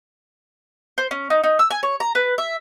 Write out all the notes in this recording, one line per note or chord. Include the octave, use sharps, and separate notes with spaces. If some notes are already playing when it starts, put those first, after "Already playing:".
C5
C#4
D#4
D#4
E6
G#5
C#5
A#5
B4
E5